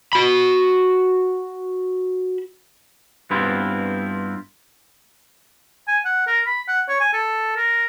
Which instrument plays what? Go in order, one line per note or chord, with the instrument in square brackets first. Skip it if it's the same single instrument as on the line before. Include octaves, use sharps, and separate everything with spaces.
[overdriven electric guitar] F#4 B5
[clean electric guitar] G2 B3 C4 E4 F4
[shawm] G#5
F#5
A#4
B5
F#5
C#5
G#5
A4
A#4